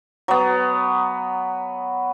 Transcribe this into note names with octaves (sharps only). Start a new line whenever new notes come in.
F#3 B3